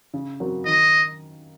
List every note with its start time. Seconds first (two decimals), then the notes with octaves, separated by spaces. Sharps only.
0.14 C#3
0.40 F#3 C4 F#4 A#4
0.66 D#3 D#5